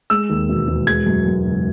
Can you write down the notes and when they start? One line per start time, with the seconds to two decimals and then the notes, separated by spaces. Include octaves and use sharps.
0.10 G#3 E6
0.30 D#2
0.49 E1
0.68 E1
0.87 G#3 G#6
1.06 F#2
1.25 F#2
1.45 F#1